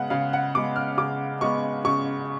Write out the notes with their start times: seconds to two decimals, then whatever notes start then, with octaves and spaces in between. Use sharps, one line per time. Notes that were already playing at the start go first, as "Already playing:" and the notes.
Already playing: C#3 G#3 B3 F#5
0.10 C#3 F5
0.33 F#5
0.55 G#3 B3 D6
0.76 F6
0.98 C#3 D6
1.41 G#3 B3 C#6
1.85 C#3 C#6